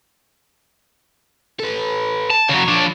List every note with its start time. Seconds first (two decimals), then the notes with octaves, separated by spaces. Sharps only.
1.60 A4 B4
2.30 A5
2.49 C#3 F#3 C#5
2.68 F3 D4